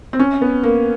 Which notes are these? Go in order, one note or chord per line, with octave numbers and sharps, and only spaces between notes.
C4
C#4
B3
A#3